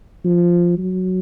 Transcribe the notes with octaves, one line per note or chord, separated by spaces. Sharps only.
F3
F#3